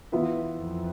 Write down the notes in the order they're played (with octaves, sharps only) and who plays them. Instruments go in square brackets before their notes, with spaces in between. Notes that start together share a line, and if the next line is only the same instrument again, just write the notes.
[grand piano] E3 B3 F4 B4 E5
[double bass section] F2